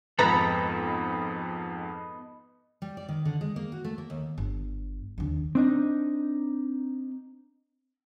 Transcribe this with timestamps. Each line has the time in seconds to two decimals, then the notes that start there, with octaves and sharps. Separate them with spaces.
0.19 F2 G#2 B3 D#4 A4 B4 A#5 B5
2.82 G3
2.97 D5
3.09 D#3
3.25 D3
3.41 G#3
3.56 A#3
3.72 F#4
3.85 A3
3.98 A#3
4.10 D#2
4.38 G1
5.18 D#2 D3
5.55 C4 D4 D#4